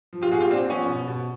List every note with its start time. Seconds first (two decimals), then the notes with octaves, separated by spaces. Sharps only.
0.13 F3
0.22 F4 G4
0.31 A#2 F#4 G#4
0.41 F4 G4
0.50 A#2 C4 D4
0.70 F3 B3 C#4
0.88 B2
1.08 B2